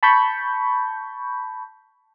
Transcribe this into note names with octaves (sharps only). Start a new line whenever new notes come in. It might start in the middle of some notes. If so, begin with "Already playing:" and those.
A5 B5 C#6 G6